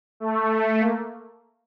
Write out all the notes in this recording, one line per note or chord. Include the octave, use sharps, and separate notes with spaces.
A3
A#3